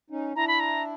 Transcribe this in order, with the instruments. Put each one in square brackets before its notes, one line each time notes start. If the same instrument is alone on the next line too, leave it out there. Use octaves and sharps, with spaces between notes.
[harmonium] C#4 D#4
[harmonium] D4 E4 [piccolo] A#5
[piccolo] B5
A#5